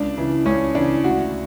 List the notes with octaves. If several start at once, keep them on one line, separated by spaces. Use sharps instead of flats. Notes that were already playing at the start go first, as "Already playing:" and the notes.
Already playing: C#2 D4
C#3 E3
C#2 C#4
C#3 E3 D4
D2 F#4